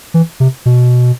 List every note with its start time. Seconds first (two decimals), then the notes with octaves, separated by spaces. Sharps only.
0.14 E3
0.40 C3
0.66 B2